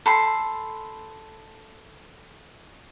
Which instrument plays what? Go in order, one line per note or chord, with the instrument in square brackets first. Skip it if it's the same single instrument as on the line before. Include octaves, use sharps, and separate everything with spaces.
[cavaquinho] A4 B5 C6